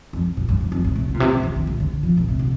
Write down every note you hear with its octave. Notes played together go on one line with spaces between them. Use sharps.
F2
A#2
G2
F2
F2
A2
C3
D3
A#2
C3
A#2
D3
D3
A#2
D3
F3
A#2
C3
D3